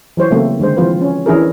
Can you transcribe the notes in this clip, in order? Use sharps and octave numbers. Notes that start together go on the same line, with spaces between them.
E3 F#3 C5 C#5
C#3 F#3 A3 A#3 C4
D3 D#3 G#3 C5
E3 F3 C4 F4 B4 C5
C#4
E3 C#4 D4 E4 G#4 A#4